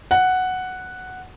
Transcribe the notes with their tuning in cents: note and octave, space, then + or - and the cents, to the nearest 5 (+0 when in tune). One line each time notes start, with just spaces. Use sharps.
F#5 +0